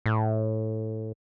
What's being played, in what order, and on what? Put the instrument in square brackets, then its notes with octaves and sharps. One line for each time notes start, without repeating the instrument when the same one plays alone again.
[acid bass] A2